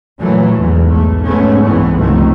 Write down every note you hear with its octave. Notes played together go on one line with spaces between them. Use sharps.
A#2 E3 F#3 A3
A1 E2 G#2
B1 A3
G#2 F3 A3 B3 C#4
C2 G2 E3 B3
C#2 C3 D#3 F3 A3